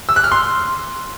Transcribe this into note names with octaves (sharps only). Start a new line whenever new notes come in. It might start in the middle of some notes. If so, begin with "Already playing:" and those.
E6
F#6
F6
C6